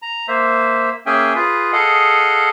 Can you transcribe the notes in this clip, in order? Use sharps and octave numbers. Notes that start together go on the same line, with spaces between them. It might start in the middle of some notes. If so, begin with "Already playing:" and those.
A#5
A#3 C5 E5
A#3 C#4 G#4 E5 G5 G#5
F4 G#4 B4
G#4 A4 D#5 F5 F#5